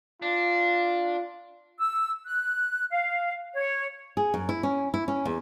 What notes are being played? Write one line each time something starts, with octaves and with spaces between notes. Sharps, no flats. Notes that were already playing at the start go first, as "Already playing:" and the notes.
D4 F4
E6
F#6
F5
C#5
G#4
F#2
E4
C#4
E4
C#4
E2